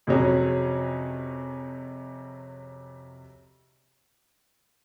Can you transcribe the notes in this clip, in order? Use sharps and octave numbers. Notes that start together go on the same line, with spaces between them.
F2 C3 F#3 C#4 G#4